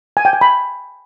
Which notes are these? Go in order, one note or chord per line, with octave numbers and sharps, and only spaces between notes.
G#5
G5
G#5
B5